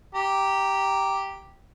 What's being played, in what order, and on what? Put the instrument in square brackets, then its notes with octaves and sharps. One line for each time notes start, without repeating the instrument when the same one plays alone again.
[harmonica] G4 A#5